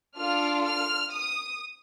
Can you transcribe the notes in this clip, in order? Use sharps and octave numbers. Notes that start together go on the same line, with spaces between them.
D4 F4 A4 F6
F6
D#6